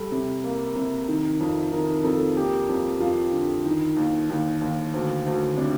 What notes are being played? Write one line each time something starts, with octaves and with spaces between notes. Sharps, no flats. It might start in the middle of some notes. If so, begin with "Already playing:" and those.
Already playing: G3 A4
C3
A#3
C3
D#3
F2
D#3 A#4
F2 A4
A#3 G4
F2
F2 F4
D3
D#3
D#2
D#2
D#2
D2
D2
C3 D4